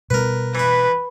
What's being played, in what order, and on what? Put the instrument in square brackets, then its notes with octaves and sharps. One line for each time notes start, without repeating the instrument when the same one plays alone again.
[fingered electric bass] B2 G3 B3 [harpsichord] A#4 B4
[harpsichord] E3 E5 [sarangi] B4